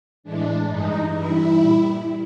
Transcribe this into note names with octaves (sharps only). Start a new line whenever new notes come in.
A2 E3 G#3 D4
G2 E3 G#3 D#4
G2 E3 G3 E4
A#2 G3